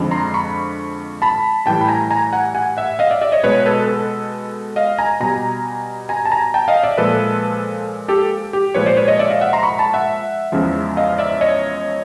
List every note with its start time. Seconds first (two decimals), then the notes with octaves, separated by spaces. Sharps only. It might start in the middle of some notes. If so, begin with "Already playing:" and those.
Already playing: F2 D3 F3 G#3
0.11 A#5 C6
0.34 B5 C#6
1.22 A5 B5
1.66 A2 E3 G3 G5 A5
1.81 B5
1.88 G#5 A#5
2.11 G#5 A#5
2.33 F#5 G#5
2.55 F#5 G#5
2.77 E5 F#5
2.99 D#5 F5
3.10 D5 E5
3.21 D5 E5
3.32 C#5 D#5
3.43 B2 G#3 B4 C#5
3.66 A4 B4
3.87 A4 B4
4.76 D#5 F5
4.98 G#5 A#5
5.20 B2 G3 G#5 A#5
6.09 G#5 A#5
6.25 A5
6.31 G#5 A#5
6.54 G5 A5
6.68 D#5 F5
6.83 D5 E5
6.98 A#2 F3 G#3 A4 B4
8.08 G4 A4
8.53 G4
8.74 A#2 F3 G#3 B4 C#5
8.86 C5 D5
8.97 B4 C#5
9.08 C#5 D#5
9.19 D5 E5
9.30 D#5 F5
9.41 E5 F#5
9.53 A#5 C6
9.63 B5 C#6
9.78 A5 B5
9.93 E5 F#5
10.52 E2 C#3 F3 G#3
10.97 D#5 F5
11.18 D5 E5
11.41 C#5 D#5